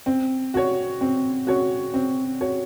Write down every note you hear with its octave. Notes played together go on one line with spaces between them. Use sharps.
C4
F#4 C#5
C4
F#4 C#5
C4
F#4 C#5